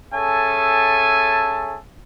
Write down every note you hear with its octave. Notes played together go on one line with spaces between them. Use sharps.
C#4 G#4 A4 E5 G#5 A5